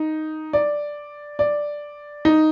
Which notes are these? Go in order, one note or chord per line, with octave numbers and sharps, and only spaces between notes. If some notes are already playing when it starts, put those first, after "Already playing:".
Already playing: D#4
D5
D5
D#4